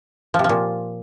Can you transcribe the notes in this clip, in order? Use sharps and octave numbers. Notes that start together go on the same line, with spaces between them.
F3
C3
F3
A#2